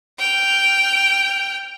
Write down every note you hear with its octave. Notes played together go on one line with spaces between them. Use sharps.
G5 F6